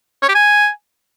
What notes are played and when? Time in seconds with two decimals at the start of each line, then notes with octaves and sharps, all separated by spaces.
0.23 C#5
0.29 G4
0.35 G#5